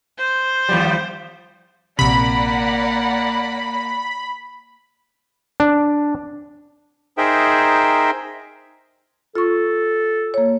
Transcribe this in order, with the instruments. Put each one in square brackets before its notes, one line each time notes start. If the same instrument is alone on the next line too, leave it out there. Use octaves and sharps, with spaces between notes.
[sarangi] C5
[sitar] D#2 F3 G3
[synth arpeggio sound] A#1 C3 [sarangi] A#3 [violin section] D5 F#5 [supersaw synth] B5
[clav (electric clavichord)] D4
[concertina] D#4 G#4 A#4 C5 E5 G5
[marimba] F4 C#6 [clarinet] A4
[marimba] A#3 C#5